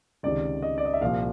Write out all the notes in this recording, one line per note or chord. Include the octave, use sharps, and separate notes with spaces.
C#2 C3 D#3 D5
D#5
D5
D#5
E5
C2 A#2 F3 F5